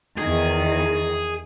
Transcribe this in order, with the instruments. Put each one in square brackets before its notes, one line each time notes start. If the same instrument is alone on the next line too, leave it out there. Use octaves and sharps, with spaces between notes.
[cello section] E2 D#3 [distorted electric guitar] G#4